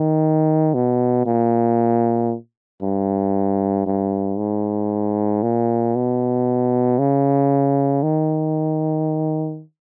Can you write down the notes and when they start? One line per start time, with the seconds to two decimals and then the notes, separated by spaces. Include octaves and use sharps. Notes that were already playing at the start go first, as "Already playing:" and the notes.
Already playing: D#3
0.74 B2
1.26 A#2
2.82 G2
3.86 G2
4.38 G#2
5.43 A#2
5.95 B2
6.99 C#3
8.03 D#3